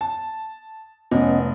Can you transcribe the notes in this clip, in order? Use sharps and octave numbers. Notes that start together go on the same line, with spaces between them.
A5
F1 B3 C#4 D#5